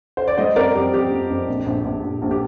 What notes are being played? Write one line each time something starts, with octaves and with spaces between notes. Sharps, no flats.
C5
D5
G3 C5 D#5
F2 A#4 D5
F2 G4
F2 G4
F2
F2
A#1
A#1
A#1
A#1
A#1
G4